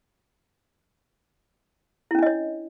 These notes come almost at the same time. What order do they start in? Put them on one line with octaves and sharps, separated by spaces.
E4 C#4 D4 D#5 C#5